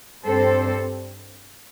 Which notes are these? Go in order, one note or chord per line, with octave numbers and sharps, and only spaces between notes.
G2 G3 C4 A4 C5